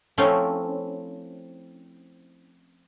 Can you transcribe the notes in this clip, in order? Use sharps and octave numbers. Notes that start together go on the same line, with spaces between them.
F3 A3 C4 C#4 E4 F5